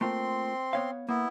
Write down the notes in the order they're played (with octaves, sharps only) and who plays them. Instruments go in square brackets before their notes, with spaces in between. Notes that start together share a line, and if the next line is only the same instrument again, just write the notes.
[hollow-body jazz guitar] A3 A#3 F4 [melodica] C4 C6
[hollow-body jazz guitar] B3 C#5 F5
[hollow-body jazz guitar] A#3 [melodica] B3 E4